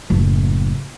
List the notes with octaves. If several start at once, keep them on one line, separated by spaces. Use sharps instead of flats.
F#1 A2